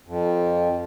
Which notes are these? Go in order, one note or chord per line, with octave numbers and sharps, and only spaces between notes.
F2